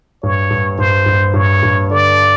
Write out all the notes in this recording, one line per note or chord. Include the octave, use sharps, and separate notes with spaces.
G2 C#5
G2
G2 C5
G2
G2 C#5
G2
D3 D5